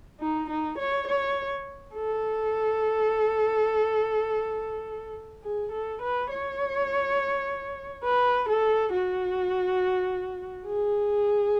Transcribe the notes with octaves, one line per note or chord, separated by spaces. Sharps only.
D#4
D#4
C#5
C#5
A4
G#4
A4
B4
C#5
B4
A4
F#4
G#4